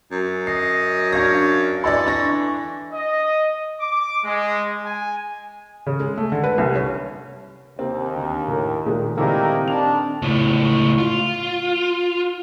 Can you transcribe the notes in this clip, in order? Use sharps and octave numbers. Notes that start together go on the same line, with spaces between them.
F#2
D#5 C7
D4 C#5 F5 A#6
E3 A4 D5 D#5 C6
D4 C#6 A#6
D#5
D6
G#3
G#5
C#3
G#3
A3
D3
B4
C2
C#4
D#2 C3 A#3 C4
D2
A2 A#4
A#2 D#3 G#3 A3
A#2 D#3 A#3 C4 D#4 E4 G4 A4
D#3 D4 F7
C#2 A2
F4